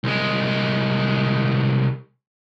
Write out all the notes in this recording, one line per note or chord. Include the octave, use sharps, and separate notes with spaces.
C2 G#3